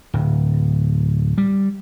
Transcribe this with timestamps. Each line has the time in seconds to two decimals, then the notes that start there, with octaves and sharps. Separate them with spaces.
0.14 D1
1.38 G3